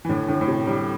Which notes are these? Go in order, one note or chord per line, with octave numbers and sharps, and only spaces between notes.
E3
A2 D3
A2 D3
A2
C3
D3 G3